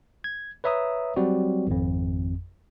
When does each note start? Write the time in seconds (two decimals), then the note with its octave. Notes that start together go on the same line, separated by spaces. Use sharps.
0.24 G#6
0.64 B4 C#5 E5 A#5 D#6
1.16 F#3 G3 C4 F#4
1.67 G#1 F2